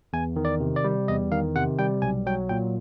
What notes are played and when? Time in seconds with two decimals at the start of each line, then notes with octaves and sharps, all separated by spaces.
0.13 E2 G#5
0.36 D#3
0.45 D5
0.60 C3
0.76 D5
0.84 G3
1.08 E2 D#5
1.31 D#3 F5
1.56 C3 F#5
1.79 G3 G5
2.02 B1 G#5
2.26 F#3 G5
2.49 A#2 G5